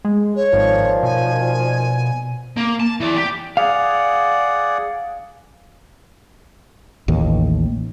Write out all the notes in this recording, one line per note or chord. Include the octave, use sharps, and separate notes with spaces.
G#3
C#5
G#1 A#2 D#3 F3
B2 G#5
A#3
A5
E3 D5
G4
G#4 D5 F5 F#5
A1 D#2